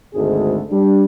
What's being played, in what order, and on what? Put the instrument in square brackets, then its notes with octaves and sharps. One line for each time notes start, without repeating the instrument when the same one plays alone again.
[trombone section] G#1 D2 G#3 G#4 A4
G3 D4